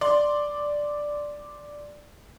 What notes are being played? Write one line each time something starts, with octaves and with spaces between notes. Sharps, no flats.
D5 C6